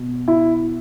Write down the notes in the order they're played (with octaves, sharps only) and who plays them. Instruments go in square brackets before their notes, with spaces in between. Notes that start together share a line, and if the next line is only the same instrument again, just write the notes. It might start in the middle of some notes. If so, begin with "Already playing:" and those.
Already playing: [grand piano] B2
E4